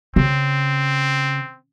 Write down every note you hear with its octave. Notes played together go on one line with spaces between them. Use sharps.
C#3 C4